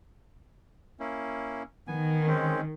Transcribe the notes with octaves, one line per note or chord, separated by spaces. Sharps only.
A#3 C#4 E4
D#3 B3 G#5
G#3 C4 C#4